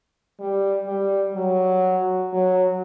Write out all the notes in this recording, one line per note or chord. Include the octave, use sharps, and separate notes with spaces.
G3
G3
F#3
F#3